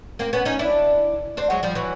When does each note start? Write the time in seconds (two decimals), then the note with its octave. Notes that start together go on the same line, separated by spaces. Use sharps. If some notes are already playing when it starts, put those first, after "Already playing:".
0.19 A#3 C4
0.33 B3 C#4
0.45 C#4 D#4
0.59 D4 E4
1.37 C4 D4
1.50 F#3 G#3
1.63 F3 G3
1.75 E3 F#3